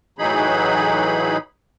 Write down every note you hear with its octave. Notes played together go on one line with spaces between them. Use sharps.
A2 E3 F#3 D#4 G#4 B5